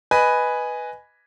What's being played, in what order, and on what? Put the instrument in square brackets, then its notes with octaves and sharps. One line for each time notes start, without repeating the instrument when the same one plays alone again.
[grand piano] B4 D#5 G#5 B5